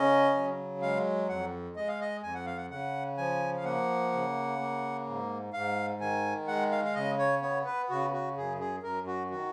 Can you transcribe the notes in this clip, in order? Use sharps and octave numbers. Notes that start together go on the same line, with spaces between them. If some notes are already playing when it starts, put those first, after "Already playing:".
Already playing: C#3 C#4 D#5
F#3
G#3 F5
F2 F#5
G#3 D#5
F5
D#5
F2 G#5
F#5
F5
F#5
C#3 F#5
F3 G#5
F5
A#3 F#5
C#3
A#3
G#2
G#2 F5
D#3 G#5
G#3 F#5
F5
F5
C#3 D#5
C#5
B3 C#5
B4
C#3 F#4
F#4
F#2 G#4
G#4
F#2 A#4
F#4
D#3 F#4